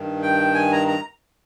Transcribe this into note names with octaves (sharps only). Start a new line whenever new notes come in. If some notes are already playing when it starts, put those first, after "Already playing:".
Already playing: G2 D#3
G5
G#5
A#5
A#5